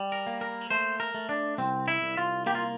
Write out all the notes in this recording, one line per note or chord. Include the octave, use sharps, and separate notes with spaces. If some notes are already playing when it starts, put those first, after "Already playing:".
Already playing: G3
A#4
A#3
A#4
A3 C5
A#4
A3
D4
C2 C4
E4
C2
F4
A#3 G4
F4